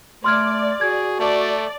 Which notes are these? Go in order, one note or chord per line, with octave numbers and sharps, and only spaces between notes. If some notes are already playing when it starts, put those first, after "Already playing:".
A3 D5 C6 F6 G#6
F#4 G#4 G#6
A3 D5 A5